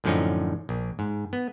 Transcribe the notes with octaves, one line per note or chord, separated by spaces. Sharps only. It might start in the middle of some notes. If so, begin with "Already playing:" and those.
F#2 A2 D3 F3 C#4 D#4
A#1
G#2
B3